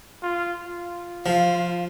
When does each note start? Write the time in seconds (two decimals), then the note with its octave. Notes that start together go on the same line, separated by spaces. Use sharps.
0.23 F4
0.65 F4
1.26 F3 F5